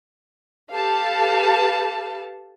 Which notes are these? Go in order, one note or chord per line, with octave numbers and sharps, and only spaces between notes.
G4 A4 B4 F5 A5